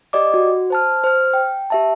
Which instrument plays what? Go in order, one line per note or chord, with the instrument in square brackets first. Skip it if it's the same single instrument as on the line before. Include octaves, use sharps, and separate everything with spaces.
[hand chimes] G4 D5 D#5 D6
F#4
C5 A5 F6
C5 F6
G5
G4 E5 A5